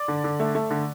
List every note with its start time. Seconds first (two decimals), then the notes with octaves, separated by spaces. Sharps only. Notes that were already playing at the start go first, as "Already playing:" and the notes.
Already playing: D5 D6
0.08 D3
0.24 D3
0.40 A3
0.55 A3
0.71 D3